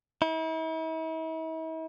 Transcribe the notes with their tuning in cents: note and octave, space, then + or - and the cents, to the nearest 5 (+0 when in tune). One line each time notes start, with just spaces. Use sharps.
E4 -45